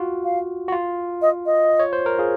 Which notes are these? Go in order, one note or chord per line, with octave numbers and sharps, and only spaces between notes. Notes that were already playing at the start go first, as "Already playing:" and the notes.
Already playing: F4 F#4
F5
F#4
F4
D#5
D#5
C#5
C5
A#4
F4 G#4